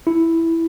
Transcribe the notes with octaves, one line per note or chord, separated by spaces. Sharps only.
E4